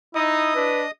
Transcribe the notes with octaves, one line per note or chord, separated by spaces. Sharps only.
D#4 E4 D#5 D#6
D4 B4